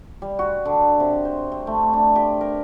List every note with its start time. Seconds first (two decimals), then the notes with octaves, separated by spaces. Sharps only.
0.22 G3
0.39 F#4
0.65 D3
1.00 C3
1.25 C5
1.52 C4
1.67 A3
1.93 D4
2.16 G4
2.41 A#4